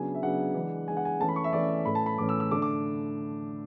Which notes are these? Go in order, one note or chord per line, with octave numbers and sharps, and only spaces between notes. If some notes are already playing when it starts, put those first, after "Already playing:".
Already playing: C#3 F#3 B3 D4 G#5
E5
C#3 F#3 B3 D4 F#5
E3 G#3 D4
E3 G#3 D4 G#5
F#5
G#5
E3 A3 C#4 A5
B5
C#6
E5
E3 A3 C#4 D5
A2 E3 A3 C#4 B5
A5
B5
A2 E3 A3 C#4 D6
E6
E6
D3 A3 D4 D6
D6